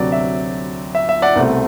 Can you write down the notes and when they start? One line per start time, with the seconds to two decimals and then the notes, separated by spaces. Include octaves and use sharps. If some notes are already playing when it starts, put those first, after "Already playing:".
Already playing: D2 C3 F#3 D5
0.12 E5
0.95 E5
1.09 E5
1.22 D5 F#5
1.36 C2 B2 A3 C4